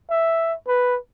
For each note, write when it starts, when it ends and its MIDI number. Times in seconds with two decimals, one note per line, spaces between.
0.10 0.55 76
0.67 0.98 71